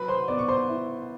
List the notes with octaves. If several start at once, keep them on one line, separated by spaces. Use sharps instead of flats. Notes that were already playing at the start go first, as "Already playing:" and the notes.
Already playing: F#3 B4 B5
C5 C6
B3 D5 D6
C#6
C5 C6
E4